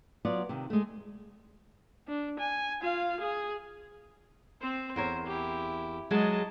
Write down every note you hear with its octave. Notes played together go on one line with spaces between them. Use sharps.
F#3 B3 F4 F#4 D5
C3 D#3
G#3 A3
D4
G#5
F4 F5
G#4
C4 C5
E2 A#4 C5 C#5
E4 G4
F#3 G#3 D#5 A5